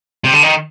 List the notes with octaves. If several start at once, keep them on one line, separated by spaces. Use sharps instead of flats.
C3
D3
D#3